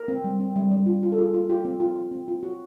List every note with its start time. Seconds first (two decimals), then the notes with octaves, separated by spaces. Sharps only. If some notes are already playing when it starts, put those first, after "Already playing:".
Already playing: A#4
0.08 C4
0.24 G3
0.40 C4
0.56 G3
0.71 G3
0.86 F4
1.03 F4
1.12 A4
1.17 F4 G#4
1.34 F4
1.49 F4 G4
1.65 C4
1.80 F4
1.96 F4
2.12 C4
2.28 F4
2.43 F#4